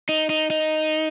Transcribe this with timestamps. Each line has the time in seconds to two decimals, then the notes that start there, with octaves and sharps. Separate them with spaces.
0.09 D#4
0.30 D#4
0.50 D#4